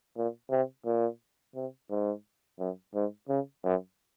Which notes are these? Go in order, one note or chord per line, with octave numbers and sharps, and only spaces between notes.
A#2
C3
A#2
C3
G#2
F#2
G#2
C#3
F#2